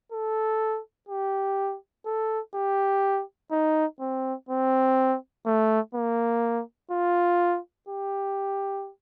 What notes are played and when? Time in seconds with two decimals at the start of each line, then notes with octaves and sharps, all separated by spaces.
0.12 A4
1.09 G4
2.06 A4
2.55 G4
3.52 D#4
4.00 C4
4.49 C4
5.46 A3
5.95 A#3
6.91 F4
7.89 G4